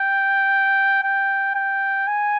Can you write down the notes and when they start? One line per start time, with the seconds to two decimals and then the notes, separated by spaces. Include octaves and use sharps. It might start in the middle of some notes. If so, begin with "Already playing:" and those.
Already playing: G5
1.03 G5
1.55 G5
2.07 G#5